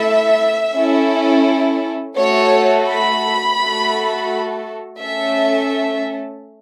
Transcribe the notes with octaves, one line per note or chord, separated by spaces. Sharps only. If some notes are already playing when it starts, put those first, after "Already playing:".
Already playing: A3 E4 A4 E5
C#4 E4 A4
A3 F#4 A4 C#5
B5
A3 F#4 A4
A3 C#4 A4 E5